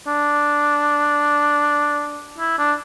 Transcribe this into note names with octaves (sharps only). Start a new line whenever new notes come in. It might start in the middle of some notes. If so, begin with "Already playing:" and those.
D4
E4
D4